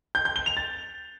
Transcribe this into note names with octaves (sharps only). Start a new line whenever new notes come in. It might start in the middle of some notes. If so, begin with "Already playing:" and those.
G6
G6
G7
F7
A6